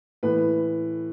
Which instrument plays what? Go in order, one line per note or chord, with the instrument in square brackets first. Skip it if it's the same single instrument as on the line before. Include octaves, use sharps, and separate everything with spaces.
[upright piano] A2 E3 B4